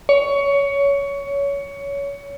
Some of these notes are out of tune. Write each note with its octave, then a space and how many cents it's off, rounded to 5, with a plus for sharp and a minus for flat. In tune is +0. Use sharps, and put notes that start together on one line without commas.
C#5 +20